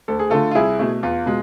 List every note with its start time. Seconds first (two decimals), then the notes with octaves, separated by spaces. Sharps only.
0.08 D2 A4
0.19 G#4
0.30 D3 A3 F4 A4
0.51 F4
0.55 C2 E4 G#4
0.79 B2 A3
1.03 E2 F4
1.26 B2 G#3